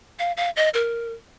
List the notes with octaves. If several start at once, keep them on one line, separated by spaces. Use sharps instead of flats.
F5
F5
D#5
A#4